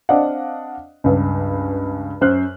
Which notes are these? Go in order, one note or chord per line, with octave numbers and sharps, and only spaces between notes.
C4 D4 D5 D#5 F5 F#5
C#2 G2 B4
F#2 C5 F6 F#6